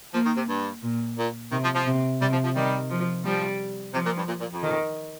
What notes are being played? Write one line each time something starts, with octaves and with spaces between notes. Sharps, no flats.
F3 A#3
D#3
C3
G2
A#2
A#2
C3 D#3
F3
F3
C3
C3 G3
F3
F3
D#3 G3
F3
F3 G3
C3 F3
A#2
G2
A#2
A#2
F2
D#3